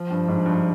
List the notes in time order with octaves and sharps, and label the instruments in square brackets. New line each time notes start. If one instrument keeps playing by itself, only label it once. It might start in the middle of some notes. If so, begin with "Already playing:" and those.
Already playing: [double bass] F3
[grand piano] G2
G#2
G2